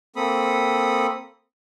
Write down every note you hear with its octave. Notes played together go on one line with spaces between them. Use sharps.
A#3 C4 A4 B5 D#6